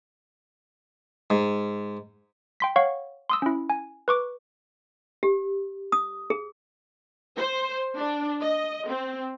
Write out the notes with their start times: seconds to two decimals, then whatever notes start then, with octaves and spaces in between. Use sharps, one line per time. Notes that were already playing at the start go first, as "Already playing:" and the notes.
1.30 G#2
2.60 G5 C6 B6
2.76 C#5 F5 F#5 C#6
3.30 C6 D#6 E6
3.42 C#4 E4
3.70 G#5
4.08 B4 C#6 D6
5.23 G4
5.92 D#6
6.30 G#4
7.37 C5
7.96 D4
8.41 D#5
8.88 C4